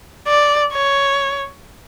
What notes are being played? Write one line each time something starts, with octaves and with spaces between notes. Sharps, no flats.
D5
C#5